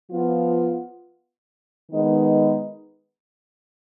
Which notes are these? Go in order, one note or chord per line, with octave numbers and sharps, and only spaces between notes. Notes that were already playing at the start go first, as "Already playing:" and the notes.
F3 B3 F4
D#3 G#3 B3 D#4 B4